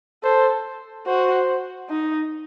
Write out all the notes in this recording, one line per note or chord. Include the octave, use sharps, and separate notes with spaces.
A4 C5
F#4 C5
D#4